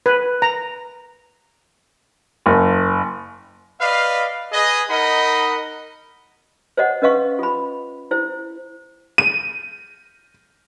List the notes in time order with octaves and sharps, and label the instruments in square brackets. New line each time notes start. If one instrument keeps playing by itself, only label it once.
[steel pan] B4
A#5
[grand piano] F#1
[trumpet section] B4 D5 D#5 F5
G#4 B4 D#5
D#4 A#4 D#5 F#5 B5
[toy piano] C5 C#5 D#5 F#5
C#4 B4 D#5 F5 C#6
F4 B5
E4 C5
[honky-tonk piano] D#7